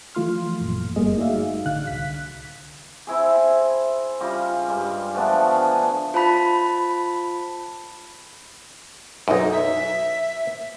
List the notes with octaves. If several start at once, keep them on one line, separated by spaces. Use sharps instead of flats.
E3 F3 A3 F4 C6 F6
A1 F#2 A#2
G1 G3 A3 A#3 G#4 D#5
D#4 F#4 G#4 D5 E5 F5
A1 D3 F5 F#6
C2 F#6 B6
C4 E4 G#4
C#3 G3 F4 D#5
G2 G3 G#3
F3 A3 B3 D4
D3 G#4
F4 C5 A5 B5 B6
B1 F#2 D#4
E5